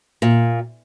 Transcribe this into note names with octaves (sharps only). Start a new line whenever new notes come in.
A#2